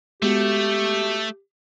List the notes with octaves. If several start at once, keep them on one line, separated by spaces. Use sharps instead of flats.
G#3 A3 B3 F#4 G4